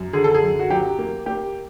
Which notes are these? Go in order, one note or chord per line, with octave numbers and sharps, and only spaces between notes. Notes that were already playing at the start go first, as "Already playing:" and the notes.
Already playing: F#2
D3 G#4
A4
G#4
F#2
F#4
F#3 G4
A#3
A#3 G4